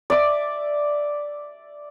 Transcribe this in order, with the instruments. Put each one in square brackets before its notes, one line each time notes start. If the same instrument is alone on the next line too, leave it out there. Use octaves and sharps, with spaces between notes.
[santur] D5 E5 D6